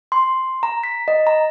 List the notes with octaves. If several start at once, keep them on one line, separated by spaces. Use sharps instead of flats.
C6
A#5
B6
D#5
A#5